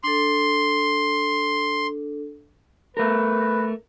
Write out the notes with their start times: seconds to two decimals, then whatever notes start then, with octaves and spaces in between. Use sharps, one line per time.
0.04 D4 A4 C6
2.97 A3 A#4 B4